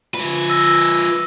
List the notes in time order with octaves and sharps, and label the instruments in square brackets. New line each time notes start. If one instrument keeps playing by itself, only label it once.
[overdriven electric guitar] F3 B4
[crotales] E6 A#6